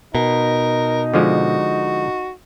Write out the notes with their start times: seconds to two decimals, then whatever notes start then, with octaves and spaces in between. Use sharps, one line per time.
0.15 B2 D#4 A#4
1.14 D3 F3 G#3 F#4